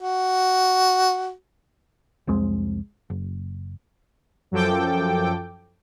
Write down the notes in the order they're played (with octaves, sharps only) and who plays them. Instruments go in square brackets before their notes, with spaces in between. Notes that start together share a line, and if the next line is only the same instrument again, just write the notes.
[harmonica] F#4
[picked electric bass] C2 F2 G#3 C4
F#1
[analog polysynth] F#2 F3 A4 G5 D6